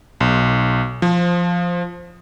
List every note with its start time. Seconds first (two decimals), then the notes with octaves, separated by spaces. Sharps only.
0.21 B1
1.02 F3